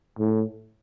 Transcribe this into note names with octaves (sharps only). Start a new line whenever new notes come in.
A2